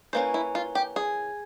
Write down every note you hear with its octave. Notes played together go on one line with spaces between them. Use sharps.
E3 A#3 C#4 C5
E4
F4
G4
G#4